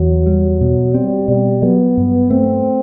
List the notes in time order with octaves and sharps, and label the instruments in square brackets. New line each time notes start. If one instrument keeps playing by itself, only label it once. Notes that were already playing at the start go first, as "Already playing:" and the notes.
Already playing: [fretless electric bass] E2 [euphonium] F#3
[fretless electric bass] G3
B2
[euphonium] G3 [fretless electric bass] C4
[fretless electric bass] B2 [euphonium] G3
[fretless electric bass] F#3 [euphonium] B3
[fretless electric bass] G2
[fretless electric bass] A3 [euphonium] C4